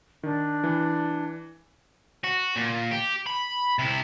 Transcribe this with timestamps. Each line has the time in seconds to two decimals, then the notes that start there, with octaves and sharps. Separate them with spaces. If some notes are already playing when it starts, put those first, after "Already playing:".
0.23 D#3 D4
0.64 E3
2.24 F#4
2.56 A#2
2.91 G4
3.26 B5
3.79 C3 E4